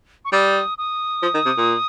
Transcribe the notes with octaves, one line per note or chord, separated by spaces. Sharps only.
C#6
G3 D#6
D#6
F3
D#3
C3
A#2